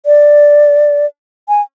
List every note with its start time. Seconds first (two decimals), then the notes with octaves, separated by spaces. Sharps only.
0.06 D5
1.49 G#5